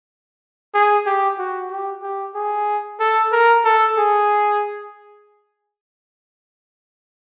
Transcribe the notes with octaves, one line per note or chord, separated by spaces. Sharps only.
G#4
G4
F#4
G4
G4
G#4
A4
A#4
A4
G#4